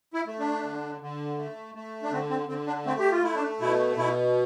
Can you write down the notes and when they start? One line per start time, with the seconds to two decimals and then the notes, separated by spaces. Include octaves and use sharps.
0.14 E4
0.27 A3
0.39 D4
0.63 D3
1.01 D3
1.38 A3
1.75 A3
2.03 D4
2.11 D3 C4
2.30 C4
2.48 D3 C4
2.67 D4
2.86 A3 C4
2.99 G4
3.11 F4
3.23 A3 E4
3.35 D4
3.60 B2 E4
3.97 B2 E4